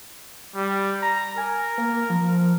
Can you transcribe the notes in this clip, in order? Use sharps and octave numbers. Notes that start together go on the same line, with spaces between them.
G3
A#5
A#4 G#5
A#3
F3